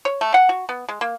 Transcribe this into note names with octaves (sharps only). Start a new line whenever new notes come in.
C#5
A3
F#5
F#4
B3
G#3
A#3